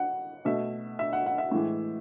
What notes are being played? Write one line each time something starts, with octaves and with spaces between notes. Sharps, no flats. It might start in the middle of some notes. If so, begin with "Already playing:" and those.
Already playing: F#5
B2 A3 E5
E5
F#5
F#5
E5
A2 E3 G#3